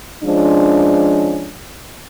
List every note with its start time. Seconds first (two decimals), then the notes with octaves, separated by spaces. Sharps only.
0.24 F3 G#3 C#4 D4